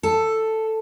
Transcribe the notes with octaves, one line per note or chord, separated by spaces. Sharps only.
A4